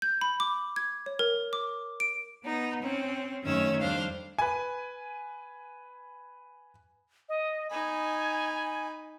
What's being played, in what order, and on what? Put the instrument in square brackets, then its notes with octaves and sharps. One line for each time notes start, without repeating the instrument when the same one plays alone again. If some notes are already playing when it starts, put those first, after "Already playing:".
[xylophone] G6
B5
D6
G#6
C#5
A#4
D6
D7
[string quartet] B3 D#4
C4 C#4
F#2 D#3 A3 C#4 C#5 E6
F2 G3 D4 C5 F5
[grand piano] B4 G#5
[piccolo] D#5
[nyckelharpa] D#4 B5 [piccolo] G#5